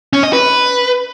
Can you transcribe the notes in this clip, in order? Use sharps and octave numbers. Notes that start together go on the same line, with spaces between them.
C#4
D#5
B4